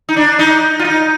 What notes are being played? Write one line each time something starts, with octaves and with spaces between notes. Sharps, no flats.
D#4
D4
D#4
F4
D#4